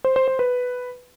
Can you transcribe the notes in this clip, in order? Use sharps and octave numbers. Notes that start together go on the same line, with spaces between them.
C5
C5
C5
B4